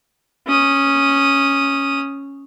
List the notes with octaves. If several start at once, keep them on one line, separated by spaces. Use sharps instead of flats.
C#4 D#6